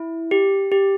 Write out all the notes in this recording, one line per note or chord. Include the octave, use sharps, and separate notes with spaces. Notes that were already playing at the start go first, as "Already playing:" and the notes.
Already playing: E4
G4
G4